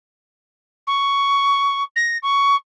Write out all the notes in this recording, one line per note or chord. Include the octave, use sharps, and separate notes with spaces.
C#6
A#6
C#6